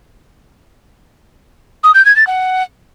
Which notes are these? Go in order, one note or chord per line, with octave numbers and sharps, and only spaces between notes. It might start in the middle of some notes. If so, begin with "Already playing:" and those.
D#6
G6
G#6
A6
F#5